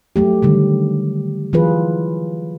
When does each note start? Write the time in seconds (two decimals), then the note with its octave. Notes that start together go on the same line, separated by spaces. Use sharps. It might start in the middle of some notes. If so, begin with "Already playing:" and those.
0.16 F#3 A3 G4
0.42 D3 D#3 G3
1.53 E3 F#3 F4 G#4 B4